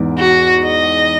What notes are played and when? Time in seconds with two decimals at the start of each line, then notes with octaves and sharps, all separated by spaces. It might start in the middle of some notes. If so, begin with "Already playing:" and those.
Already playing: E2 G#2
0.18 F#4
0.64 D#5